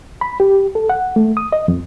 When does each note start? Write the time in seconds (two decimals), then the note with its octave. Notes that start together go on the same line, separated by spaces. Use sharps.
0.21 B5
0.40 G4
0.75 A4
0.90 F#5
1.16 A3
1.37 D#6
1.53 D#5
1.68 F2